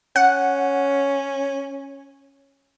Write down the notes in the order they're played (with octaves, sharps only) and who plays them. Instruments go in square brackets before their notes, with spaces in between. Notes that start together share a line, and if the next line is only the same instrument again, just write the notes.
[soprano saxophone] C#4 [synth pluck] F#5